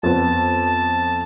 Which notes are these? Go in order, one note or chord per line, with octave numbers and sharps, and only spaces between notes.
F2 B3 A5